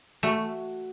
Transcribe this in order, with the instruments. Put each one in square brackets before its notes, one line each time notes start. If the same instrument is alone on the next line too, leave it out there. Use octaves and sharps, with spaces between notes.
[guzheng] A3 [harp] F#4